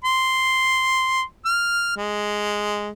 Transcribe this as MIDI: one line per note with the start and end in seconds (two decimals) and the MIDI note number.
0.04 1.22 84
1.45 1.94 89
1.97 2.89 56